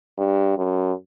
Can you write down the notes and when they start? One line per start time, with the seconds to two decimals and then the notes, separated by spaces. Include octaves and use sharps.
0.18 G2
0.58 F#2